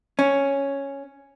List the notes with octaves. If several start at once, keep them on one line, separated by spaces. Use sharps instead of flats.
C#4